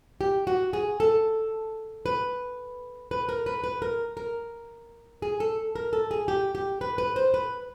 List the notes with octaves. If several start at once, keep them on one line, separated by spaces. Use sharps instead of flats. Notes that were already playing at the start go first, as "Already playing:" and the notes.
G4
F#4
G#4
A4
B4
B4
A#4
B4
B4
A#4
A#4
G#4
A4
A#4
A4
G#4
G4
G4
B4
B4
C5
B4